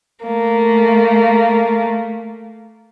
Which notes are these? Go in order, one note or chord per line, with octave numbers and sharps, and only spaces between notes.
A3 A#3